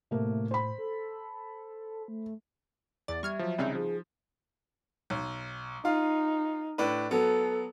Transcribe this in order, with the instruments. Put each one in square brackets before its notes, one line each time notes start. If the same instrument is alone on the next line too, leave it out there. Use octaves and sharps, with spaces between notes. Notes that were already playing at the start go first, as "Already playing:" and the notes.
[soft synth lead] A2 [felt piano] C3 A3 A#3
[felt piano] C5 B5
[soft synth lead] A4
A3
[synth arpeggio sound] E2 A6 [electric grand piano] D5
[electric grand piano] G3 [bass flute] E5 [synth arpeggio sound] C#6 F6 G#6
[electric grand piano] F3 F#3
[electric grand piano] C2 C#3 [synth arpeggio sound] G3 C4 D#4
[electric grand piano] F3 [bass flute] G#4
[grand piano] B1
[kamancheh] D#4 [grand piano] F4 F5
[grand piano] A2 D4 B4
[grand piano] F#3 B3 [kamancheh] A4